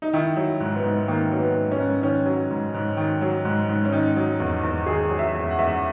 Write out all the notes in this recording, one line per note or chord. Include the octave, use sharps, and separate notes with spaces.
D#4
D#3 E4
F#3
G#2
B3
G#2
D#3 A#3
F#3
B3
G#2
C#4
G#2
D#3 C#4
F#3
G#2
G#2
D#3
F#3
G#2
G#2
C#4
D#3 D#4
F#3
E2
E2
D#3 G#4
F#3
E5
E2
F#5
E2 E5
F#5